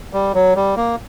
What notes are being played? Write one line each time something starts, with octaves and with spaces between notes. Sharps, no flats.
G3
F#3
G3
A#3